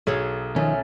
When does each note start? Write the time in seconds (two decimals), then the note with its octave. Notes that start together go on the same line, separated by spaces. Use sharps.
0.07 B1 G#4 A4 C#5
0.56 D#3 F3 A3 C#4